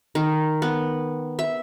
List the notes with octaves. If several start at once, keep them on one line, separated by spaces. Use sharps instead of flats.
D#3
B3
E5